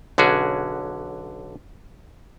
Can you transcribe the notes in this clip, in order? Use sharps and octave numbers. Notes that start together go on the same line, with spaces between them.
B1 D3 C#4 F#4 G#4